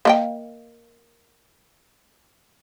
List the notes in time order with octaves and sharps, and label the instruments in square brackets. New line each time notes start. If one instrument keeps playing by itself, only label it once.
[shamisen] A#3 A#4 G5 [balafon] D#5 F5